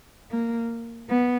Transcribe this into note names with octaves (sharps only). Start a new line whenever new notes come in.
A#3
B3